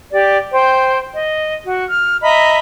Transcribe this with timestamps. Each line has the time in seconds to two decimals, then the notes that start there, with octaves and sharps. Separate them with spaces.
0.12 G4 D5
0.52 C5 G5
1.13 D#5
1.65 F#4
1.90 F6
2.22 D#5 E5 A#5 B5